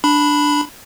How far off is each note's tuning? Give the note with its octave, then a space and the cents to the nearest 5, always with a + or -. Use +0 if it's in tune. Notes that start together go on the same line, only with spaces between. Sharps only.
D4 +0 B5 +0